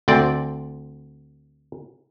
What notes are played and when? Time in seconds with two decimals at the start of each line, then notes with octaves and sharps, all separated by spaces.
0.08 D2 C4 D5